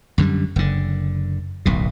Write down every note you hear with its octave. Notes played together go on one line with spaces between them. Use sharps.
F#2 D3 D#3 G3
F#1 D3
D1 B1 B2